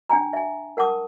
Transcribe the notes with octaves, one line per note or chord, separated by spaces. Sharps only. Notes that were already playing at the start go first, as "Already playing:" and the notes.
D4 G5 G#5 A#5
E5 G#5
A#4 F#5 A5 D6 D#6